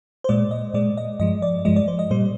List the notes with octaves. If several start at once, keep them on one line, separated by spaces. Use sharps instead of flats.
C5
A#2 G#3 D5
D#5
A#2 G#3 D5
D#5
G2 F3 G#3 D#5
D5
G2 F3 G#3 D#5
D5
C5
D#5
A#2 G3 C5